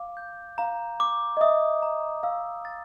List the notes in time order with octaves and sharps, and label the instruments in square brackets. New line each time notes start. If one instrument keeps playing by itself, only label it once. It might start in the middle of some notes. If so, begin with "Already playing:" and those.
Already playing: [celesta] F5 [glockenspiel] D6
[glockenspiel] G6
[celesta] F5 [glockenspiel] A#5
[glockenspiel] D6
[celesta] D#5
[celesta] E5 [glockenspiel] D#6
[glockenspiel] A#5
[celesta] F5 [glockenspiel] E6
[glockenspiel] A6